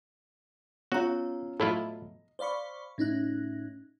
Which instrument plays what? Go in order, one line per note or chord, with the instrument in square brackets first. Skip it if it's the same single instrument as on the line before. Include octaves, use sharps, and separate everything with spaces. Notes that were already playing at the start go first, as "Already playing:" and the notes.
[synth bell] B3 A#5 [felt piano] C#4 F4 [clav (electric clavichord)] F#4
[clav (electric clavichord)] A2 E4 F4 [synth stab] F#3 A3 [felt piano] D#5
[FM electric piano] C5 D5 F5 B5 C#6
A2 C#4 D#4 F#6